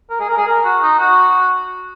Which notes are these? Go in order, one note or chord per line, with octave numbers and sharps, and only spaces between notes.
A#4
G#4
A#4
G#4
A#4
F#4
D#4
F#4